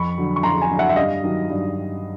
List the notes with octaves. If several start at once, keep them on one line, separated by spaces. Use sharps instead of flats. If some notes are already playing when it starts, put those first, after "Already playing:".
Already playing: F2 B5 C#6
D3 F#3
C#6
F2 A#5 C6
G#5 A#5
D3 F#3
E5 F#5
E5
G2 D#5 F5
D#3 F#3
G2